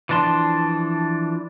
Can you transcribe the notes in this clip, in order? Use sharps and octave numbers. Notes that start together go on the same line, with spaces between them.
E3 F3 D4 A5 C6